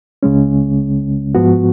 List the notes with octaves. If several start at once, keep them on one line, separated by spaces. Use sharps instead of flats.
C#2 C#3 G#3 C#4
G#2 F3 B3 F#4